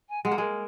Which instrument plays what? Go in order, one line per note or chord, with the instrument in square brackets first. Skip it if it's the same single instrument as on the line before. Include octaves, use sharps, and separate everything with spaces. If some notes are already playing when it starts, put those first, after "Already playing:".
[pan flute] G#5
[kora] G#3 [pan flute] F#5
[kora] A#3
[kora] G#3 [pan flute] A#4